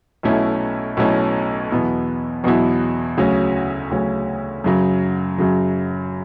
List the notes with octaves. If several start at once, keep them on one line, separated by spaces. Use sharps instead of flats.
B1 B2 A3 C#4 E4
B1 B2 A3 C#4 E4
E2 B2 F#3 B3 E4
E2 B2 F#3 B3 E4
D2 C#3 F#3 C#4
D2 C#3 F#3 C#4
F#2 C#3 F#3
F#2 C#3 F#3